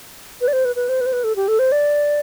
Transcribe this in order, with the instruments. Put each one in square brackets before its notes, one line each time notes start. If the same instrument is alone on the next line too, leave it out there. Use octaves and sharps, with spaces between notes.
[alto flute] B4
D5
C5
B4
B4
C5
B4
C5
B4
A4
G4
A4
C5
D5